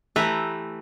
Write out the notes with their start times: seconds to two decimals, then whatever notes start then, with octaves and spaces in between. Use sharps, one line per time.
0.16 E3 A3 G4 B4 E5 A#5